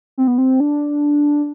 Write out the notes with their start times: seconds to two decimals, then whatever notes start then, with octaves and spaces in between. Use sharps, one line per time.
0.18 C4
0.27 B3
0.38 C4
0.60 D4